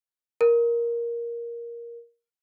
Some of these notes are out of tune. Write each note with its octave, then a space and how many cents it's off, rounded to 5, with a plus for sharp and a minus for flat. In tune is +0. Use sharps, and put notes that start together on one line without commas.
A#4 +10